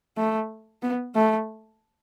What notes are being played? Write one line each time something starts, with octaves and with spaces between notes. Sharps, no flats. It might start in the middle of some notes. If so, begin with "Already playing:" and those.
A3
B3
A3